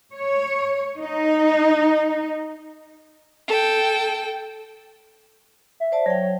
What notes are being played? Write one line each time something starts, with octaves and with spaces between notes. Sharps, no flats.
C#5
D#4
A4 G5
E5
C5 D5 A5
F#3 C#5 G5